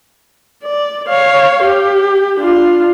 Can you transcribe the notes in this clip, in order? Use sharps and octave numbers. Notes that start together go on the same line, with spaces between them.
D5
C#5 F5
G4
D4 F4